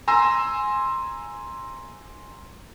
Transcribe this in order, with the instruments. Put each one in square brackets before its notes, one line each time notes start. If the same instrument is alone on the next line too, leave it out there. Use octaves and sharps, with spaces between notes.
[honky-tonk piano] G#5 A#5 C6 E6 A#6